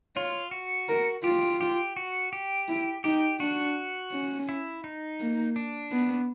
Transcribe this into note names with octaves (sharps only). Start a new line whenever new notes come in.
F4 C#5
F#4
A#4
F4 G4
G4
F#4
G4
E4
D#4 G4
D4 F#4
C#4
E4
D#4
A#3
D4
B3